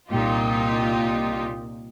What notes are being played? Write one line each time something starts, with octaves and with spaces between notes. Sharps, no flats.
C2 A#2 D#4 F4 G4